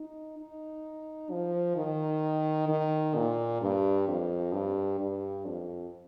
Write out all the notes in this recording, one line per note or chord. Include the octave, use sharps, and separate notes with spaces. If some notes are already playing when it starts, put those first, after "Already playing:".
Already playing: D#4
D#4
F3
D#3
D#3
A#2
G2
F2
G2
G2
F2